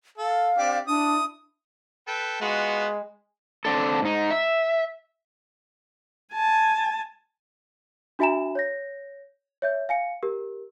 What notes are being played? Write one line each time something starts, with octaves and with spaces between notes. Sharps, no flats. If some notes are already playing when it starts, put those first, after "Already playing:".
A4 F5
C4 D4 G4
D4 E4 D#6
A4 B4 G5
G#3 B3 F4 F#4
C4 D4 A4
G#2 D#4
E5
G#5 A5
D4 F#4 E5 G#5 A#5 E7
C#5 G6 A#6
C#5 E5 G6
F5 G#5 C#7
G4 A#4